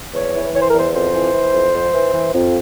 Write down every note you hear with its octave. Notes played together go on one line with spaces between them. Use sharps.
E2 C#5
E3
E3 C#5
C5
A#4
E2 C5
F2 C5
E3
E3
F2
F2
E3
E3
F2